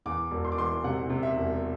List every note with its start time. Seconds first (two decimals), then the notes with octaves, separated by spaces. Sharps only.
0.06 E2 D6
0.31 E1
0.45 C6
0.52 D6
0.57 E3 C6
0.84 C3 F#5
1.10 C3
1.23 E5
1.36 E1